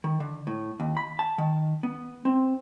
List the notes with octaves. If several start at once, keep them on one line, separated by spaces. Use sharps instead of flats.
D#3
D3
A2
D#2
B5
A5
D#3
B3
C4